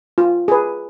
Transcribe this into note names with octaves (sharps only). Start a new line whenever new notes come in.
F4
G#4 B4